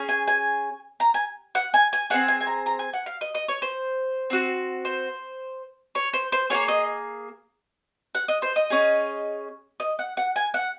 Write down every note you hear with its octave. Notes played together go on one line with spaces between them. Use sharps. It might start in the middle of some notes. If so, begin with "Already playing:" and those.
Already playing: C#4 G#4
G#5
G#5
A#5
G#5
F#5
G#5
G#5
C4 F4 G#4 F#5
G#5
G#5
A#5
A#5
G#5
F#5
F5
D#5
D#5
C#5
C5
C4 F#4
C5
C#5
C5
C5
A#3 F4 G#4 C#5
D#5
F#5
D#5
C5
D#5
C#4 G#4
D#5
F#5
F#5
G#5
F#5